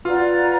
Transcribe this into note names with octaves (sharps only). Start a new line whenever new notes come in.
F4 B4 D5 F#5 A#5